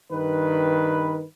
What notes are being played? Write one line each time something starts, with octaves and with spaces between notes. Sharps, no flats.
G2 D#3 B4